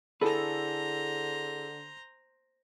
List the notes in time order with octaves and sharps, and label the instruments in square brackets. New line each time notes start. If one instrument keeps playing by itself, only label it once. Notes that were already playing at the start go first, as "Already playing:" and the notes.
[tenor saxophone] D3 [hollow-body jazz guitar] E4 G#4 B4 [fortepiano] A4 [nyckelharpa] C5 A#5